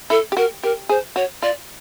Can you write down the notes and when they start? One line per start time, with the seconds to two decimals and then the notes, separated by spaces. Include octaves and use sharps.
0.10 E4 A4
0.32 G4
0.37 F#4 A#4
0.63 G4 A#4
0.89 G#4 C5
1.16 F#4 C#5
1.42 F4 D5